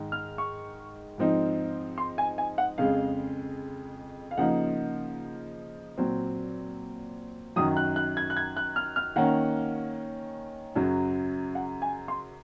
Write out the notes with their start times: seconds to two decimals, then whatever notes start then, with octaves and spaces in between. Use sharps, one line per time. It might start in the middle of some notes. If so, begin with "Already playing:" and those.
Already playing: G#2 D#3 G#3
0.12 F6
0.38 C#6
1.18 G#2 F3 C4 D#4
1.98 C6
2.18 G#5
2.38 G#5
2.58 F#5
2.78 F2 C#3 G#3 F5
4.31 F5
4.37 C#3 F3 A#3 D#4 F#5
5.98 A#2 F#3 C4
7.56 F#2 D#3 F#3 D#6
7.77 F#6
7.96 F#6
8.17 G#6
8.30 F#6
8.37 G#6
8.57 F#6
8.76 F6
8.96 F6
9.16 D#3 A#3 C#4 F#5
10.76 F#2 C#3 F#3
11.55 F#5
11.82 G#5
12.08 C6